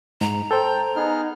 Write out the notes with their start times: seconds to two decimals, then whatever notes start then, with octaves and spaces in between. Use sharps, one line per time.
0.21 G#2 A#5
0.51 A4 C5 G5 G6
0.96 B3 D#4 G#4 F6